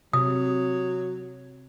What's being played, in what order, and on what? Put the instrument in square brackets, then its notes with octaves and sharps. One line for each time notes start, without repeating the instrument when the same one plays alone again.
[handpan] C3 [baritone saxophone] F#3 [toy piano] D#6